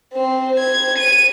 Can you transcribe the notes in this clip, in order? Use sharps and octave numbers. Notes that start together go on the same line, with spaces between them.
C4 C5
G#6
D#7